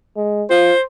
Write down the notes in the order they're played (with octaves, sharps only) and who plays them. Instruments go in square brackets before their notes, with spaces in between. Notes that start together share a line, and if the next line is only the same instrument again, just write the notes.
[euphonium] G#3
[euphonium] F4 [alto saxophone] C5